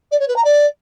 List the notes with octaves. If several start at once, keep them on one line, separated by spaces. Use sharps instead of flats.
D5
C#5
B4
A#5
D5